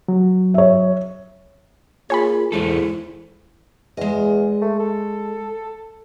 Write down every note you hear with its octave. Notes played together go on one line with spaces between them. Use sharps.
F#3
C#5 E5
A#3 F4 G#4 C#5 G#5 B5
E2 G#3 E4 G#4 A4 C5
E2 G#3 D#5
A3
A4